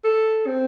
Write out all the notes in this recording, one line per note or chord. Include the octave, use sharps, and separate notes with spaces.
A4
C4